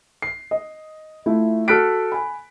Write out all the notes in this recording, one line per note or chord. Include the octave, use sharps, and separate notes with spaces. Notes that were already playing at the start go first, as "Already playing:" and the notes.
C7
D#5
A3 E4 F4
F#4 A4 F6 F#6 B6 D7
G#5 B5